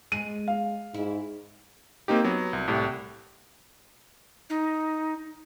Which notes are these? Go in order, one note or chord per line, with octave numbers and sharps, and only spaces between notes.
G#3 D#7
F5
G#2 E4
A#3 C4 D#4 G4
F#3 B3
C2
C2 A2 G4
D#4